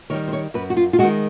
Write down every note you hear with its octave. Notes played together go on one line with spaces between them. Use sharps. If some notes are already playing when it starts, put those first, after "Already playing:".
D#3 G3 C#5
C5
C#5
F#2 B4
F#4
F4
F4
D#3 G#3 F#4